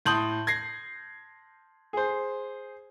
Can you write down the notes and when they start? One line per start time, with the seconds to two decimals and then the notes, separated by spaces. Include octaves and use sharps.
0.06 A2 A5 C6 D#6 G6 F#7
0.47 G#6 A#6 C7
1.93 G#4 C5